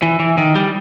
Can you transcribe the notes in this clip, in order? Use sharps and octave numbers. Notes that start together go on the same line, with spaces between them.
E3
E3
D#3
G3